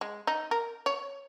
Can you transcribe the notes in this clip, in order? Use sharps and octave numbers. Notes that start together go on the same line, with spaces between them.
G#3
D#4
A#4
C#5